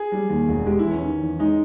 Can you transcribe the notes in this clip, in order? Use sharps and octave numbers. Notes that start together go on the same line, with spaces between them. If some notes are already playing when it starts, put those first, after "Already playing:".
Already playing: G#4
G3
D#2
E1
G#3 G4
E4
E2
C#4
D#3
E2
G#3 D#4